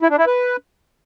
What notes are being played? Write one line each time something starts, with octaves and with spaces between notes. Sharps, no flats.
E4
D4
E4
B4